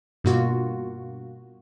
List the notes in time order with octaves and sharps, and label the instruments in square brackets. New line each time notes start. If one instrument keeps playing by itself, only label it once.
[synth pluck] G2 B2 A#3 F4 F#4